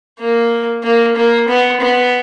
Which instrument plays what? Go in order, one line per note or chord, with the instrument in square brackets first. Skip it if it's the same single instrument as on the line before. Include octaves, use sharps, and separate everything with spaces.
[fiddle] A#3
A#3
A#3
B3
B3